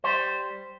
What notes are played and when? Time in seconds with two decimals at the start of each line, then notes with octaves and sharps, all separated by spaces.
0.04 G3 C5